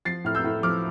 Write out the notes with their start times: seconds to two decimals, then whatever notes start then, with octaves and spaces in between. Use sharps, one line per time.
0.05 F3 A6 C7
0.24 A2 F6
0.35 E6 G6
0.44 A2
0.63 F3 D6 F6